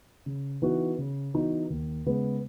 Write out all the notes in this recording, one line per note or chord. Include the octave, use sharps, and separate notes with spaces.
C#3
E3 B3 D#4 F#4
C#3
E3 B3 D#4 F#4
D#2
C#3 G#3 B3